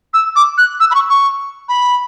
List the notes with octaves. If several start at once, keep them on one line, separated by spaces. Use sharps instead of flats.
E6
D6
F#6
E6
B5
C#6
C#6
B5